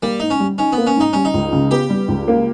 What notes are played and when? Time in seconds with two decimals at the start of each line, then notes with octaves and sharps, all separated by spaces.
0.03 G3 A#3
0.20 G#2 D#4
0.30 C#4
0.40 G3
0.58 C#4 D#4
0.72 B3
0.78 A#3
0.87 C#4
0.96 G#2 D#4
1.13 G3 C#4
1.25 D#4
1.34 C#2
1.53 C#3
1.71 B3 G4
1.90 G3
2.08 C#2
2.28 A#3